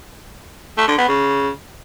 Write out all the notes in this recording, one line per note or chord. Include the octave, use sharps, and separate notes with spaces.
A3
D3
B3
C#3